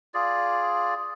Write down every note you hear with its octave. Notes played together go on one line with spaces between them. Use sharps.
F4 G#4 D5